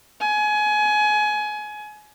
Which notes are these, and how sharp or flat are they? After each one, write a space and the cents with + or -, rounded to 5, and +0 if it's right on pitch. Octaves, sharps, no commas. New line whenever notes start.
G#5 +25